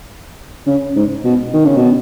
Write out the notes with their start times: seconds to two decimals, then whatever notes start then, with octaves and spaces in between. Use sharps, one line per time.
0.67 C#3
0.95 G#2
1.24 B2
1.53 D#3
1.65 C#3
1.77 B2